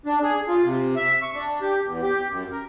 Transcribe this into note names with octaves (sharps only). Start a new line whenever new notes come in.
D4
G#4
F4
C3
E5
C#6
D4
G4
E2
G4
F#2
A#4